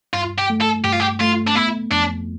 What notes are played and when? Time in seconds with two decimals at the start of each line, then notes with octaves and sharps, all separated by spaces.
0.14 G2 F4
0.38 G4
0.50 A3
0.61 A4
0.84 G2 G4
0.93 F4
1.00 G4
1.20 A3 F4
1.47 D4
1.55 B3 E4
1.91 F2 D4